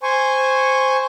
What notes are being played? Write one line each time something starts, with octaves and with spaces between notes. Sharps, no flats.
C5 G#5 C#6